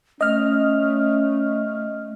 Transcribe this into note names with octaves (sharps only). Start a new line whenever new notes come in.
A3 C#4 D#5 F6